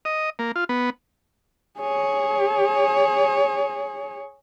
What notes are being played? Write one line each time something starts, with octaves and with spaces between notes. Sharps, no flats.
D#5
A#3
F4
B3
G#4 C#5